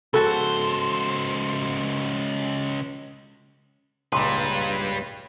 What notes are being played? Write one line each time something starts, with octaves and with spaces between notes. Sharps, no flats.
C#2 F#4 A4 C5
C#2 A#2 G3 B4 C6